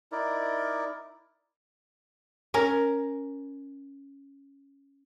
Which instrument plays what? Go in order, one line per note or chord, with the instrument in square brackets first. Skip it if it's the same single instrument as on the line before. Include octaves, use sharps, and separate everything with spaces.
[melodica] D#4 E4 A#4 D5
[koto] C#4 A#4